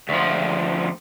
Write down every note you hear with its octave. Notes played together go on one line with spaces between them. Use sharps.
D2 F3